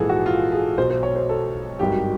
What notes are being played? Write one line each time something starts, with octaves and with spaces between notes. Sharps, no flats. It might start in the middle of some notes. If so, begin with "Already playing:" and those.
Already playing: A#1 G#2 E3 G#4 A4
F#4
F4
G#4
B1 B2 F#3 C5
C5
C#5
C5
A4
G#1 G2 D#3 F#3 G4